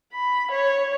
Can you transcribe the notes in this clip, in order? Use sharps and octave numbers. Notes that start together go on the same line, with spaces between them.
B5
C#5